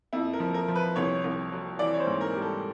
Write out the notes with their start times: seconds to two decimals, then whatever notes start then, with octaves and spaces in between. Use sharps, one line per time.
0.13 F2 E4
0.33 A#4
0.40 F3
0.54 A#4
0.68 F3
0.75 B4
0.96 C2 C#5
1.24 C2
1.52 F#3
1.79 E3 D5
1.94 C#5
2.00 C5
2.07 G#2
2.21 A#4
2.35 G3
2.42 A4